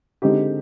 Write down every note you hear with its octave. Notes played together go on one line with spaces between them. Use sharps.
D3 G#3 C4 D#4 G4